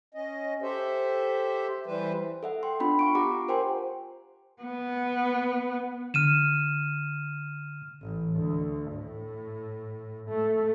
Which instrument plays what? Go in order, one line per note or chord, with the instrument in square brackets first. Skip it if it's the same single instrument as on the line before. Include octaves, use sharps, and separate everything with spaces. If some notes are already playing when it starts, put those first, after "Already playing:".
[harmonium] C#4 D#5
G4 A4 C5 E5
E3 G3 B4 C5
[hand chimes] A4 E5 F#5
G5 C6
B3 D4 F4 B5
F5 C#6 D7
F4 G4 F#5 A#5 D6
A#4 C5 G5 G#5 C6
[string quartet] B3
[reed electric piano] D3 [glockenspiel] F6 D#7 E7
[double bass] A1
D2
A2
A3